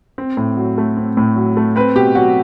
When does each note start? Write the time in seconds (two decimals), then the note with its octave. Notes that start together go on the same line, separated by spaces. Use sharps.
0.18 C4
0.37 A2
0.57 F#3
0.78 A3
0.97 C4
1.17 A2
1.36 F#3
1.57 A3
1.76 C4 B4
1.95 B2 G4
2.15 F#3 F#4